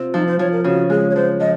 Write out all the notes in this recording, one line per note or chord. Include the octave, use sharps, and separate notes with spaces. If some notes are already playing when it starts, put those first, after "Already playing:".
Already playing: C3 C4 F4
F3 D#4
C5
F3 C#5
A#4
C#3 F#4
G#3 G#4
C#5
F3 C5
F3 D#5